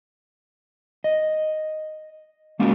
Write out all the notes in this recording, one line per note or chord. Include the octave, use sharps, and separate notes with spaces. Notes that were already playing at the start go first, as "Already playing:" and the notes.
D#5
G#3 A#3 C#4 F4 F#4 A#4